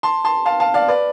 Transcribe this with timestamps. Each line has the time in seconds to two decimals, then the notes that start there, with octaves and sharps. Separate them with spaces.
0.03 A5 C6
0.25 A5 C6
0.46 F5 A5
0.60 F5 A5
0.74 D5 F5
0.88 B4 D5